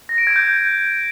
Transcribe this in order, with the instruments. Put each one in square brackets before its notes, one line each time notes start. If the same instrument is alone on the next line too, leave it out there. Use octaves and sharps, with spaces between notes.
[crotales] A#6
D7
G#6
G6